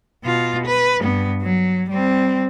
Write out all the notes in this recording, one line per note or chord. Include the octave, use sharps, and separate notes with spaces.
B2 F4
B4
G2 B3
F#3
G3 C4